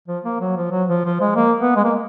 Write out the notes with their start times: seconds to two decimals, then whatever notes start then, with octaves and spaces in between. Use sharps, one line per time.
0.08 F3
0.25 A#3
0.41 F#3
0.57 F3
0.72 F#3
0.89 F3
1.05 F3
1.21 G#3
1.36 A#3
1.60 B3
1.76 G#3
1.84 A#3